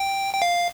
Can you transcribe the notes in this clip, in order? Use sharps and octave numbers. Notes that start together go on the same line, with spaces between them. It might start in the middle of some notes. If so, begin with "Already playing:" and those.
Already playing: G5
G5
F5